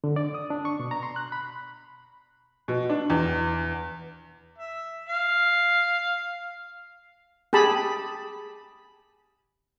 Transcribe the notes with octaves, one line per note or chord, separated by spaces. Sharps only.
D3
D5
D#6
D4
C#6
B2
A#5
C6
F#6
B5
B2
D4
E2
E5
F5
G4 G#4 A5 B5